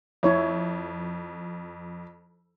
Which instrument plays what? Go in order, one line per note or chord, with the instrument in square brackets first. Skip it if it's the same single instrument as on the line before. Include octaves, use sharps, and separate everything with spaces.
[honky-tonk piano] F2 [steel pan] E4 C#5 E5